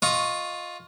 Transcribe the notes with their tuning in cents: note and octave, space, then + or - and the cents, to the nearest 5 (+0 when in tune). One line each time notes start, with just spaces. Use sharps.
F4 +15 D#5 +0 C#6 +0